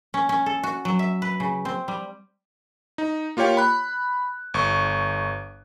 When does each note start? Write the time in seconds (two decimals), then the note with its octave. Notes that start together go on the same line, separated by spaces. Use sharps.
0.14 C#4
0.29 C#4
0.46 A4
0.63 F#4
0.85 F#3
0.99 E5
1.22 B4
1.40 C#3
1.65 C4
1.88 G3
2.98 D#4
3.37 A#3 F4 G4 C#5 G5
3.57 B5 F#6
4.54 G1 C#6